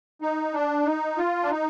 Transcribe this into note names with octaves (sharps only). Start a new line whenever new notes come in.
D#4
D4
D#4
F4
D4
D#4